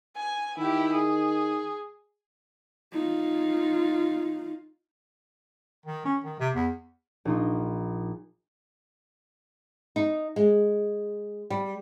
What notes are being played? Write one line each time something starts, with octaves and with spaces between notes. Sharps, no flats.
G#5
D#3 E4 G4
G#4
D#4 F4
D#3
C#4
D#3
C3
E2
A#1 D#4 C6
D#4
G#3
G3